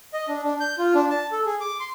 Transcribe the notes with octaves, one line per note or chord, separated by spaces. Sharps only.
D#5
D4
D4
G6
F4
D4
A5
A4
G#4
D6
C6